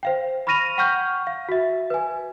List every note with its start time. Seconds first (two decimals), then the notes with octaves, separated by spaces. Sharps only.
0.03 C5 F5 G5
0.47 B5 C#6 F6 A#6 D#7 F7
0.78 F#5 G5 C#6 F6 G6
1.27 F5
1.49 F#4 E5
1.90 B4 G#5